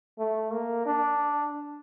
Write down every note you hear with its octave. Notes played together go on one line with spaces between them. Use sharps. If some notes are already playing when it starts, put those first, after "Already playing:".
A3
A#3
D4